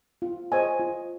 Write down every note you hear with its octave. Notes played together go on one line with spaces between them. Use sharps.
F4
C5 D#5 G#5
F4